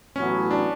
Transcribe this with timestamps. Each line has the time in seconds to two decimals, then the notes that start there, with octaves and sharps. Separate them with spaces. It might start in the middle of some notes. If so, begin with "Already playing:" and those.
0.16 A1 A2 F#3 B3 C#4
0.51 D4